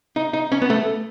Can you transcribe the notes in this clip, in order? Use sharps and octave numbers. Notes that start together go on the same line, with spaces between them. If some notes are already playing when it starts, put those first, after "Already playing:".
D#4
D#4
C#4
B3
A3